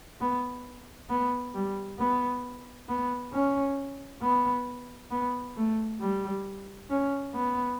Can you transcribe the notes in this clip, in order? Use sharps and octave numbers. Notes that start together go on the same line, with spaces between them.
B3
B3
G3
B3
B3
C#4
B3
B3
A3
G3
C#4
B3